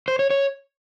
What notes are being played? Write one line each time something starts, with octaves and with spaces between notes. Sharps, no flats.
C5
C#5
C#5